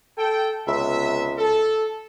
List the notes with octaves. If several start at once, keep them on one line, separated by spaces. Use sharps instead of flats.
A4 G5
C#2 C3 B3 E5
A4